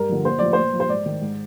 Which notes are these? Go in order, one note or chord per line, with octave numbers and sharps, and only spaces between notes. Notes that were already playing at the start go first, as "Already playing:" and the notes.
Already playing: G2 A#4
D3 F3
A#2 C5
F3 D5
A#2 C5
F3
C5
G#2 D5
D#3
G#2